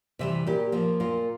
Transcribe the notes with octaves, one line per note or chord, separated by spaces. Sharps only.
C3 E3 G3 E5
A#2 G4
F3 A#3
A#2 F4